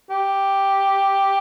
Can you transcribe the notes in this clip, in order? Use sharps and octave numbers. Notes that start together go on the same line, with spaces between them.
G4